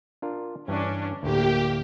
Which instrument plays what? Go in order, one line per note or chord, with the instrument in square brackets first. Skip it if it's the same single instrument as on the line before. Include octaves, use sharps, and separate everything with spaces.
[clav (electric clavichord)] D4 F4 A#4
[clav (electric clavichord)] G2 E3 [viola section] C#4 D4
[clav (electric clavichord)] D2 A2 [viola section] A#3 [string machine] G4